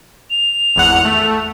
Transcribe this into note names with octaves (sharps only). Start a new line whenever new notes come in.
F7
G#1 E2 F#5
A3